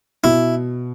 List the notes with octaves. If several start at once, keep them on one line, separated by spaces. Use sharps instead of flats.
B2 E4